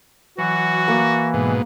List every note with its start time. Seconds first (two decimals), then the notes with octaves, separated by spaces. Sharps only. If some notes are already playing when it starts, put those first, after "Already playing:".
0.38 E3 F#3 F#4
0.88 A#3
1.34 G#2 B2